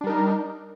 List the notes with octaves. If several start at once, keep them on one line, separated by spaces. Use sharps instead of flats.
G3 D4 D#4 A#4